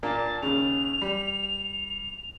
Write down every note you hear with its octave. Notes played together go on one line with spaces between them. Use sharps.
A#2 A#3 D4 A5
D#2 C#3 F7
G3